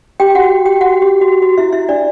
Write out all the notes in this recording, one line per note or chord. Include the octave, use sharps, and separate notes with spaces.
G4 G5
F#4 F#5
G4 G5
F#4 F#5
G4
F#4
F#4
E4 E5
E4 E5
D4 D5